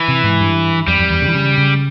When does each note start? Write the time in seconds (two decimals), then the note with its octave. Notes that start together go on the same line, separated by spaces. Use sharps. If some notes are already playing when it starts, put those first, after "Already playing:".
Already playing: E3
0.08 C3
0.24 G#2
0.40 G2
0.88 F2 G3
0.99 F2
1.10 E2
1.22 C#3
1.28 E3
1.35 C#3
1.58 C#3